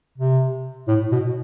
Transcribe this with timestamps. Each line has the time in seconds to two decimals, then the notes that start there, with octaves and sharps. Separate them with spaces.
0.18 C3
0.88 A2
1.11 B2